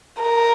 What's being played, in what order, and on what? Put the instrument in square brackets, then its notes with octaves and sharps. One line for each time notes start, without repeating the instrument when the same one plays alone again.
[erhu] A#4